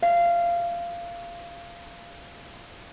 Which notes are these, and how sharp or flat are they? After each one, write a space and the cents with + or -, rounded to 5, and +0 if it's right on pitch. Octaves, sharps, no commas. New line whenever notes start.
F5 -15